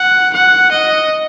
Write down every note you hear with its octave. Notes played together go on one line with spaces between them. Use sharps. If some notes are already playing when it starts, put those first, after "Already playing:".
Already playing: F#5
F#5
D#5